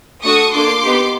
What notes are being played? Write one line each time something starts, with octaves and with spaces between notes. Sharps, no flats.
A3 D4 F#4 A4 C#6 D#6
A#3 D4 F4 A4 C6 D6
B3 D#4 G4